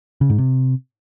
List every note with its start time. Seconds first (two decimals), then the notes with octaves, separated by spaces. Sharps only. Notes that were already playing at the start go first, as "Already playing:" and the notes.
0.21 C#3
0.30 G#2
0.38 C3